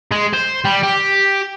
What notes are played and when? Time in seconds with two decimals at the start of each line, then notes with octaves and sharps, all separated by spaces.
0.11 G#3
0.33 C5
0.65 G3
0.83 G4